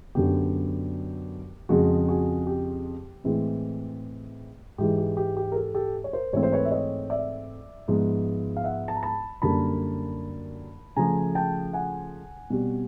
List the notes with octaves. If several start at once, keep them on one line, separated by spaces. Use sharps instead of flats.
F#2 D3 F#3 B3 G4
F2 C#3 F3 G#3 F#4 G#4
F#4 G#4
G4
A2 E3 G#3 C4
G#2 E3 G#3 G4
G4
G4
G4
A#4
G4 A4
G4 A4
C#5
A#4 C5
G#2 E3 A3 C4 C#5
C5
B4 C#5
E5
C#5 D#5
D5 E5
G#2 F3 G#3 B3
F5
E5 F#5
A5
A#5
A5 B5
F#2 D3 G3 A#3 A5 B5
C#3 F3 A3 G#5 A#5
G5 A5
F#5 G#5
B2 G3 C4